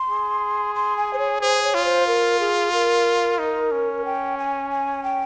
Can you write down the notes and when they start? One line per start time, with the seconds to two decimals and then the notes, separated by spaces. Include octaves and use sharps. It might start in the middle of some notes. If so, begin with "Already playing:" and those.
Already playing: C6
0.10 G#4
0.75 C6
0.97 G#5
1.13 C5
1.19 C#5
1.41 G#4 C5
1.63 C#5
1.75 F4
1.85 C5
2.07 A#4
2.40 G#4
2.73 A#4
3.39 D#4
3.72 C#4
4.05 G5
4.38 G#5
4.71 G#5
5.03 G5